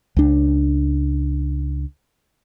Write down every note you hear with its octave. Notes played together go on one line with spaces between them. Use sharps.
C#2 D4